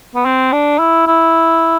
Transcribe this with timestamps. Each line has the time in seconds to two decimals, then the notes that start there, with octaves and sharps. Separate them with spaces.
0.15 B3
0.25 C4
0.53 D4
0.79 E4
1.07 E4